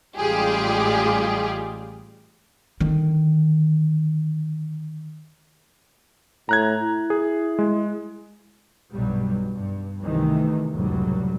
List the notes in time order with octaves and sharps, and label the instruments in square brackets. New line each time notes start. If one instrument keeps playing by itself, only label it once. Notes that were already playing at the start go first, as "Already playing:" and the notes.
[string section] A1 G3 G#3 F4 G4 G#4
[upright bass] D3 D#3
[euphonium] A2 [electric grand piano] A#5 F#6 G#6
[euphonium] E4
[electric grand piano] G#4
G#3
[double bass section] B1 G2 B2 F#3 G3
G2
C2 C3 D#3 E3 A3
F1 C#2 A2 F#3 G3